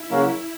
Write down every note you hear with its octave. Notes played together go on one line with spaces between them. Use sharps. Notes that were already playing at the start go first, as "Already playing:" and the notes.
Already playing: E4
C#3 F#3 A#3 C#4 F#4